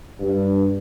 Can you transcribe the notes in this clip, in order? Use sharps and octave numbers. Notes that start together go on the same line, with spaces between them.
G2